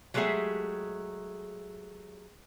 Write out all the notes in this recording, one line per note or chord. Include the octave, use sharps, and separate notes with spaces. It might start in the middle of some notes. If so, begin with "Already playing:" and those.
F#3 G#3 A3 G4 G#4 E5